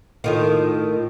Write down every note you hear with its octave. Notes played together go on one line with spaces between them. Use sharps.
A2 D#3 F4